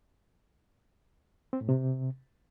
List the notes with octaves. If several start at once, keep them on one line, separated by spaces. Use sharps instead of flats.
C4
A2
C3